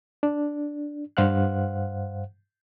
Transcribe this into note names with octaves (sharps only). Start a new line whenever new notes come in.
D4
G2 C5 F5 F#5 F#6